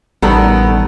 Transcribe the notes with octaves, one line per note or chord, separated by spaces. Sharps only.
A1 D#3 G3 B3 A4 A#5